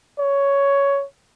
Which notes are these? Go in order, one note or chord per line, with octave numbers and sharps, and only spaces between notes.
C#5